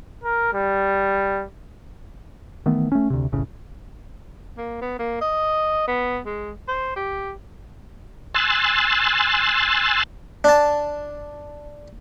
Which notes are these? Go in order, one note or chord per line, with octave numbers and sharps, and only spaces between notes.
A#4
G3
D#3 E3 A3 B3
A3 C#4
D2 C3
F1 A#1 A2 C#3
A#3
B3
A#3
D#5
B3
G#3
C5
G4
G#5 C6 E6 F#6 A6
D4 A5